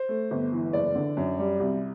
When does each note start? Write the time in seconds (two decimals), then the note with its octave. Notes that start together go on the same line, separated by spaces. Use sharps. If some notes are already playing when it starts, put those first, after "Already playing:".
Already playing: C5
0.09 A3
0.31 G1
0.52 E3
0.73 F#1 D5
0.95 D3
1.17 F#2
1.39 G3
1.60 C2